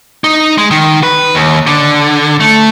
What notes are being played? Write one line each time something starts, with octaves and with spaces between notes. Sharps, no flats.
D#4
G#3
D#3
B4
D#2
D3
A3